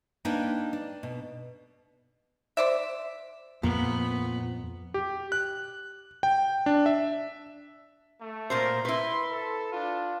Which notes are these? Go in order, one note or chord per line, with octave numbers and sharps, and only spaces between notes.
A#3 D4 D#4 A#4 B4 G5
D4
B2
C5 D5 E5
F2 A#2 B3
G4
F#6
G5
D4
E5
A3
A#2 A#4 C5
E4 B4 C6
A4
D4 F4